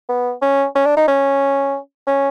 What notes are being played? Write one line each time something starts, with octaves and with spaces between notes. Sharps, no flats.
B3
C#4
C#4
D4
D#4
C#4
C#4